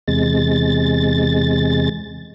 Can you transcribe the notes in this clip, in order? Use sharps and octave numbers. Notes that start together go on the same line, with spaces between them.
E2 C3 G#3 A6